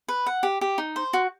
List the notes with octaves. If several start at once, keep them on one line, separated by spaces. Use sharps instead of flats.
B4
F#5
G4
G4
D#4
C5
F#4